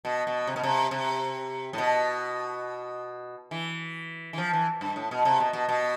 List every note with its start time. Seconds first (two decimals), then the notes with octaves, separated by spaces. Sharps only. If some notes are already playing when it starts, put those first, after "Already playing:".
0.05 B2
0.27 B2
0.47 C3
0.56 B2
0.64 C3
0.91 C3
1.73 A2
1.78 B2
3.51 E3
4.33 E3
4.38 F3
4.53 E3
4.81 G2
4.96 A2
5.11 B2
5.25 C3
5.40 B2
5.53 B2
5.69 B2